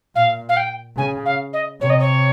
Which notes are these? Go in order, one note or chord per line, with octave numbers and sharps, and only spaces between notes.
A#2 F5
F5
G5
C#3 G#5
F5
D#5
C3 C#5
D#5
C#5